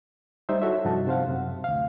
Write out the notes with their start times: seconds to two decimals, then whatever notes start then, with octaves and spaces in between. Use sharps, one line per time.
0.49 G3 D#4 C5 E5
0.62 E4 F#4 A4 C#5 E5
0.85 G2 C3 F3 D#4 F#4 A5
1.07 C3 C5 F5 F#5
1.27 F#2 C3
1.64 D2 F5